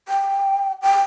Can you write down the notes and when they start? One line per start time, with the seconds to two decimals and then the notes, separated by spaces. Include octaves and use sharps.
0.08 G5
0.82 G5